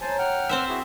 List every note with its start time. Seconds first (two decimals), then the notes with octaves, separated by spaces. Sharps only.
0.01 A#4 C5 C#5 G#5 A5
0.19 F#5 G5 F6
0.49 C4 C5 E5
0.69 E4 F#4 G#4